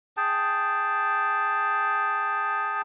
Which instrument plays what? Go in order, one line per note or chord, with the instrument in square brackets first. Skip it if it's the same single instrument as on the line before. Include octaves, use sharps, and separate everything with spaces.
[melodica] G#4 G5 A5